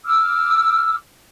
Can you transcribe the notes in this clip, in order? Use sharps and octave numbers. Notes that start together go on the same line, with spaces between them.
D6 E6 F6